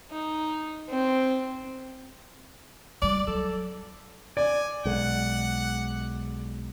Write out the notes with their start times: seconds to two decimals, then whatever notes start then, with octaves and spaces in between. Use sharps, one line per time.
0.11 D#4
0.90 C4
3.02 C#2 G3 D5
3.27 F#3 A4
4.37 D5 G#5
4.85 B1 G#3 F#5